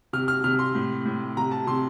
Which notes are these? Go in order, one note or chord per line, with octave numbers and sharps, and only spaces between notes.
C3 F6
F6
C3 F6
C6
A2
A2
C3 A#5
A5
C3 C6